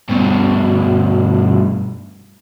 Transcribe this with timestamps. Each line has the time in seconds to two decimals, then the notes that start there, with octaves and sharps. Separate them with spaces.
0.10 G2 B2